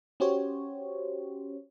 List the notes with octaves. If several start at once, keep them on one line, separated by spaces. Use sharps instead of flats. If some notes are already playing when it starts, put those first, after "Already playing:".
C#4 F#4 G4 C5 C#5